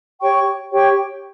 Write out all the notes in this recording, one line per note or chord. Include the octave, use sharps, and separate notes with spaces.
G4 C#5 G5 C#6
G4 C#5 G5 C#6